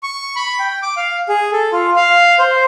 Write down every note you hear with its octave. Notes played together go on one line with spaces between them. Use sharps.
C#6
B5
G5
D6
F5
G#4
A4
F4
F5
C5